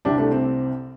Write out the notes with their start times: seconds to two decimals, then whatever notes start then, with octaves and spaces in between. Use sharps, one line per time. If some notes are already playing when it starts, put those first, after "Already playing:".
0.05 C2 C3 D4 G4
0.18 A3 D4
0.31 C4